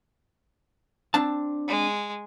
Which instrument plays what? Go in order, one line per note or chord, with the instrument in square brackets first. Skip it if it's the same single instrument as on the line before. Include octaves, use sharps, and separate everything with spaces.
[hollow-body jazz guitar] C4 D4 A5
[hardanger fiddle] G#3